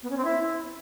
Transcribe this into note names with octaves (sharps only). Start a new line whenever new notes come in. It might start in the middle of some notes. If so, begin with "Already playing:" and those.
B3
C#4
C4
E4